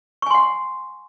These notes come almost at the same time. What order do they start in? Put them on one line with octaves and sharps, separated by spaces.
C#6 G#5 C6 F#5